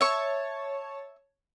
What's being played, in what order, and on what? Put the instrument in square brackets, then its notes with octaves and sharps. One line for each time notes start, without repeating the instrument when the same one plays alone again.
[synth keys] C#5 A5 [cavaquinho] E5 C#6